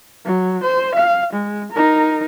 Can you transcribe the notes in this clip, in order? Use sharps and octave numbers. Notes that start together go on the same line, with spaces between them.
F#3
C5
F5
G#3
D#4 A#4